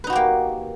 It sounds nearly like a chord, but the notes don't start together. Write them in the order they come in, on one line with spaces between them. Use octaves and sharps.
B4 D#4 F#4 G4 A#3